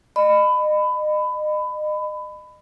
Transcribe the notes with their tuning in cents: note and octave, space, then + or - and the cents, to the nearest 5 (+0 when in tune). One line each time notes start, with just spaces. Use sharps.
D#5 -35 B5 +20